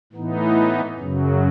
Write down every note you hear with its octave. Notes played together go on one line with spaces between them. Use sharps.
A2 E3 B3 D#4
F#2 C#3 F#3